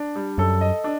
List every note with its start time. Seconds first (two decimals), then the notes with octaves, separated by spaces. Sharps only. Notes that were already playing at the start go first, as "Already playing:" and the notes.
Already playing: D4
0.15 G3
0.38 F#2 A4
0.61 D#5
0.84 D4